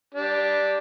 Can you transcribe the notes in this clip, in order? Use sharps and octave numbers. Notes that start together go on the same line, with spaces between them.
D4 G4